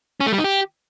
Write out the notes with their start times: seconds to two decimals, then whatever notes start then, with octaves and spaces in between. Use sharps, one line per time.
0.20 C#4
0.26 A3
0.32 G3
0.38 D#4
0.44 G4